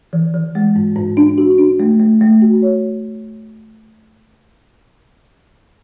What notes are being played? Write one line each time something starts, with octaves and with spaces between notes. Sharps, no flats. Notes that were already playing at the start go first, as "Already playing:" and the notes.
E3
E3
G#3
G#2
G#2
D4
F#4
D4
A3
A3
A3
F#4
C#5